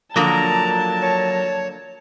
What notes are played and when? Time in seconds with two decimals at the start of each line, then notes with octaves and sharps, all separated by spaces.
0.16 D3 F3 F#3 A#3 A#4 A5 A#5
1.02 C#5